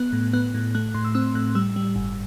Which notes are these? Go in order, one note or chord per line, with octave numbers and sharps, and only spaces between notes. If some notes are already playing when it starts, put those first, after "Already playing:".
Already playing: B3 F#6
A2
B3 F#6
A2
A3 F#6
A2 C6
E6
C4 E6
A2 F#6
G3 E6
G3
G1